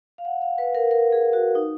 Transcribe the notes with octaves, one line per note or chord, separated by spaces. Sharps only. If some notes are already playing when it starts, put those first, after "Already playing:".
F5
F#5
F5
B4
A#4
A#4
G#4
F#4
D#4